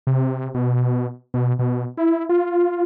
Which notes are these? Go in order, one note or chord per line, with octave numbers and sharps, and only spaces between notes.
C3
B2
B2
B2
E4
F4